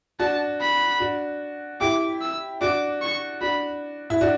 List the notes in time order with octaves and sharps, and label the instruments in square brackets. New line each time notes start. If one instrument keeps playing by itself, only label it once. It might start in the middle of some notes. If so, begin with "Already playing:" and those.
[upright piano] D4 F#4 [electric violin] A5
[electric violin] B5
[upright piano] D4 F#4
[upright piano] E4 G4 [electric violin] D6
[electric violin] E6
[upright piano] D4 F#4 [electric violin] D6
[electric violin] C#6
[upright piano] D4 F#4 [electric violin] B5
[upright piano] E4
D4 F#4